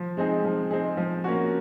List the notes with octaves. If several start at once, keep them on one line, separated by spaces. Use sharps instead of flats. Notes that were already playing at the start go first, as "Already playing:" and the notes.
Already playing: F3
G#3 C4 D#4 G#4
F3
G#3 C4 D#4 G#4
F3
A#3 C#4 F#4